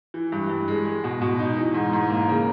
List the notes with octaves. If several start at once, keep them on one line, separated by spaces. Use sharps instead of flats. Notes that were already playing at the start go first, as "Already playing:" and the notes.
E3
G2
G2
G#3
G#3
B2
B2
D#4
E3
G#2
G#2
A#3
C#3